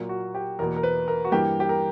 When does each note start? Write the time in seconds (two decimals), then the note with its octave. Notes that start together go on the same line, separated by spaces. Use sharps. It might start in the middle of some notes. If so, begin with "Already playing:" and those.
Already playing: A#2 F#3 A#3
0.09 F#4
0.35 G4
0.59 E2 B2 A#3 A#4
0.76 A#4
0.83 B4
1.08 A#4
1.25 F#4
1.32 G2 E3 A#3 G4
1.60 G4
1.69 A#4